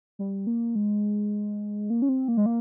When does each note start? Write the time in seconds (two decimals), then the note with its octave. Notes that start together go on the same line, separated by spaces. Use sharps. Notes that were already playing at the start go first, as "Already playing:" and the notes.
0.19 G3
0.47 A#3
0.75 G#3
1.90 A#3
2.02 C#4
2.09 C4
2.28 A#3
2.37 G#3
2.46 A#3